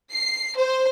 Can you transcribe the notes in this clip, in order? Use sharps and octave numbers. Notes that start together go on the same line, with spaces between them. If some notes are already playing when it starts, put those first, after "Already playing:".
C7
C5